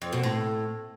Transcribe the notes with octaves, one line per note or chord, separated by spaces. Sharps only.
F2
B2
A2